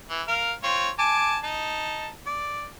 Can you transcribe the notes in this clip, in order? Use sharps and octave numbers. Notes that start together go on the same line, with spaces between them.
E3
A#4 F5
C4 F4 C#5
G#5 A5 D6
D#4 A5
D5